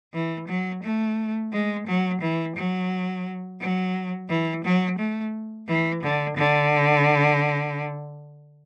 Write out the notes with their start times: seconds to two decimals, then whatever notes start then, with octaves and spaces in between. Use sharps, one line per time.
0.14 E3
0.48 F#3
0.83 A3
1.52 G#3
1.87 F#3
2.21 E3
2.56 F#3
3.60 F#3
4.29 E3
4.64 F#3
4.98 A3
5.68 E3
6.03 D3
6.37 D3